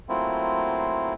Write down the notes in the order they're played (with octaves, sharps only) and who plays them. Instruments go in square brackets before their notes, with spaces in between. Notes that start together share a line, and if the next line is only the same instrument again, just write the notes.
[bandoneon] F#3 A3 A#3 C4 E4 F4